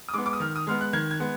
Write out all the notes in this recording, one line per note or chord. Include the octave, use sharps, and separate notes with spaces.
D#6
G#3 B3 D6
D6
D#6
D#3 F6
D#6
G#3 B3 F6
F#6
D#3 G#6
G#6
G#3 B3